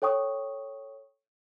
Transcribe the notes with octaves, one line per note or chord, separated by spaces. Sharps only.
A4 C#5 G5 C#6 D#6